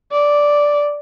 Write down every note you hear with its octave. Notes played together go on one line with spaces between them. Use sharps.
D5